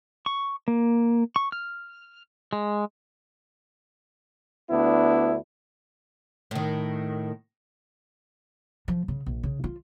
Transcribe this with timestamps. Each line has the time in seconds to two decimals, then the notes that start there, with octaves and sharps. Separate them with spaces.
0.26 C#6
0.68 A#3
1.36 C#6
1.52 F6
2.53 G#3
4.70 D2 B3 D4 E4
6.51 A2 D#3
8.88 F3
9.08 C#3
9.26 A#1
9.43 C#3
9.64 F4